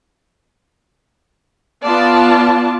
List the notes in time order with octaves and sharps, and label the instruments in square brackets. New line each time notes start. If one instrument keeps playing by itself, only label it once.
[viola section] B3 F4 D5 A5